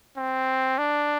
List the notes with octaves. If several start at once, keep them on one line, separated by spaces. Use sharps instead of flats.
C4
D4